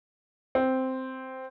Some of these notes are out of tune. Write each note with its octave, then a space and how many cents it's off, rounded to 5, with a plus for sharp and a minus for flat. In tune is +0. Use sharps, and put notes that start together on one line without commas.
C4 -5